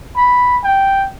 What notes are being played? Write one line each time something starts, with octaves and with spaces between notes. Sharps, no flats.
B5
G5